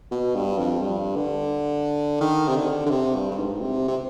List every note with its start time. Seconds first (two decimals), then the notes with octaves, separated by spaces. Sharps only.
0.11 B2
0.35 G2
0.58 F2
0.82 G2
1.16 D3
2.21 D#3
2.48 C3
2.57 D3
2.86 D3
2.91 C3
3.15 G2
3.31 G2
3.38 G#2
3.61 C3
3.88 C3